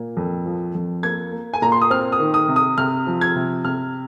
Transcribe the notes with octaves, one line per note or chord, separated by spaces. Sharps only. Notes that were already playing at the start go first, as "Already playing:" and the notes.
Already playing: A#2 A#3
F2
F3
F2
A#3 G#6
A#3
G#5
A#2 A#5
C6
D#6
C4 F6
D#6
D#3
D#6
C3
D#6
C3 F6
F3
G#6
C3
C3 F6